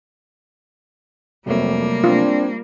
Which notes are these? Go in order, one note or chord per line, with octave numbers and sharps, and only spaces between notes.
F2 C3 F#3 G3 A3 A#3
C4 D4 F4